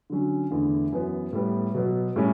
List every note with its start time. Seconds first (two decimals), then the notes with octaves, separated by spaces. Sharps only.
0.10 D3 F#3 C#4
0.51 E2 D3 A3 E4
0.93 F#2 E3 B3
1.33 A2 G3 B3
1.74 B2 F#3 B3
2.16 A2 G3 C#4